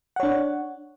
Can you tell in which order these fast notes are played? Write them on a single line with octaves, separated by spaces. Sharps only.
F#5 C#5 D4